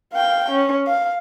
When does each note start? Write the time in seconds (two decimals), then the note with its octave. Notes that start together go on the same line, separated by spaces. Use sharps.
0.13 F5 G5
0.51 C#4
0.87 F5